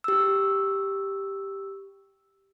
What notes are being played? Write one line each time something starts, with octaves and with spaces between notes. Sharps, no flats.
G4 E6